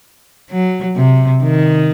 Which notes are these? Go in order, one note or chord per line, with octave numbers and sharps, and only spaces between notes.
F#3
C3
D#3